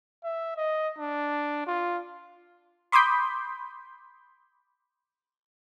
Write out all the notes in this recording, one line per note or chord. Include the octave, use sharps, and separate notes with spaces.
E5
D#5
D4
F4
B5 C6 D6 D#6 G6 B6